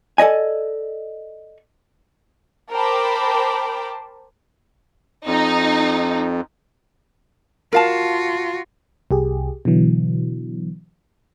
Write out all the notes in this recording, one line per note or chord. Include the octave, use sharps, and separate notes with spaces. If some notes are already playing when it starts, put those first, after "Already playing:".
A4 D5 D#5 G#5
A#4 C5 G5 A5 B5 D6
F2 D#4
F4 F#4 A#4 F5 A5
C2 G4 G#4
B2 D3 E3 F#3